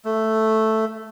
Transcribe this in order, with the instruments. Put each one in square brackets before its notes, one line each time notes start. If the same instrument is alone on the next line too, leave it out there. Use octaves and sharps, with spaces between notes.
[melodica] A3